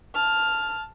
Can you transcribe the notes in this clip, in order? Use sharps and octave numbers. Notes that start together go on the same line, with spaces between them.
A5 F6